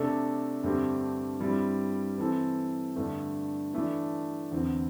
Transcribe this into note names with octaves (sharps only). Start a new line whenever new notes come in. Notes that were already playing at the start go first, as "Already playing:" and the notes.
Already playing: C3 A3 D4 A4
G2 D3 A3 C4 G4
G2 G3 C4 E4
E3 C4 A4
G2 D3 A3
E3 A3 D4
E2 D3 C4